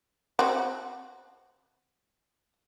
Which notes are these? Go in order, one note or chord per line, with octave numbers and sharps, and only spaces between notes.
C4 F#4